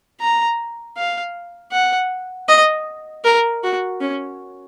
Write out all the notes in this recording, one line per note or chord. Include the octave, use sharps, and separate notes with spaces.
A#5
F5
F#5
D#5
A#4
F#4
C#4